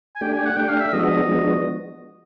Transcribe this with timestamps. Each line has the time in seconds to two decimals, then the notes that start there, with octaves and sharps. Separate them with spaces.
0.16 G#5
0.21 A3 D4 G4 G5
0.33 G#5
0.46 F#5
0.57 A3 D4 G4 G5
0.69 F5
0.81 E5
0.93 F3 G#3 B3 D4 F#4 D#5
1.29 F3 G#3 B3 D4 F#4